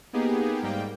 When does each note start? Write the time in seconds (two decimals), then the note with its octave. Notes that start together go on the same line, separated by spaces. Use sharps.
0.13 A#3 B3 D#4 G4 G#4
0.62 G#2 G3 A#3 G5